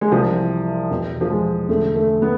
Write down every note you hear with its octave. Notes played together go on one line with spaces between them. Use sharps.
G#3
C2 C3 E3 F3
E2 B2
F3
G#3
E2 D3 A3
A3
B3